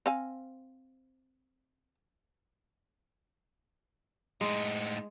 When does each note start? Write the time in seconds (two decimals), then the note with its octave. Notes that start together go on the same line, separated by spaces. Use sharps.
0.06 C4 F5 G#5
4.41 A2 G#3 D#4